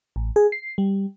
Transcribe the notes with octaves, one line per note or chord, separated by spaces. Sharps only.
A1
G#4
C7
G3